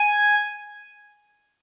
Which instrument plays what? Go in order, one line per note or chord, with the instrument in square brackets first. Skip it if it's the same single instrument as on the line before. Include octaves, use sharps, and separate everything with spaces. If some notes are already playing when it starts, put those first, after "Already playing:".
Already playing: [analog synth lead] G#5